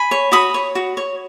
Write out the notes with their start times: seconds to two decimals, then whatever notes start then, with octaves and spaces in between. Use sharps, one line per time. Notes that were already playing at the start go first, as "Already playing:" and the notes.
Already playing: G#5 B5
0.11 C#5
0.32 F#4 B5 D#6
0.54 C#5
0.75 F#4
0.97 C#5